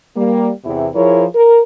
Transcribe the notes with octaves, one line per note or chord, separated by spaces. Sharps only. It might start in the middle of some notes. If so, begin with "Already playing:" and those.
G3 A#3
E2 C3 E4
F3 E4 G#4 A#4 C#5
A#4